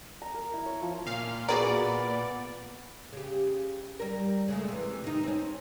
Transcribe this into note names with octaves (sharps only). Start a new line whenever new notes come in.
A#5
A#4
E4
C#5
F3
A#2 F5
B3 F#4 G#4 A#4 D5
C#3 G4
G3 A#4
C#3 G#3 A3
C3 E3
D#3 D#4
C4 C#4